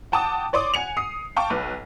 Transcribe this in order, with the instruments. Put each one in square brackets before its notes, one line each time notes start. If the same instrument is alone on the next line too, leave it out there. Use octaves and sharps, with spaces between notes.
[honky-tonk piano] F#5 G5 A5 D6 D#6
C#5 D5 C6 D6 D#6
F#5 G#5 C#7 F7
D#6 C7
F5 G5 A5 C#6 D6
B1 B4